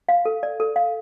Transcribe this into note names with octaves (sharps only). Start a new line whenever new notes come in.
F5
A4
D5
A4
F5